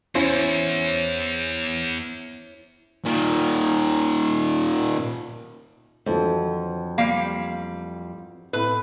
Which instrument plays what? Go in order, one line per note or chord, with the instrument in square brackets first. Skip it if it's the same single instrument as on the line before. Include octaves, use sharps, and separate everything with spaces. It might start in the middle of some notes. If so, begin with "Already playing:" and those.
[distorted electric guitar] E2 [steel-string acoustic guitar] C#4 E4 C#5 [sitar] C5
[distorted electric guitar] A#2 D#3
[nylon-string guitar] F2 [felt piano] D3 E3 F#3
[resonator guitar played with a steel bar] G3 A#3 F5
[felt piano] A2 A3 C4 [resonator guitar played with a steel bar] B4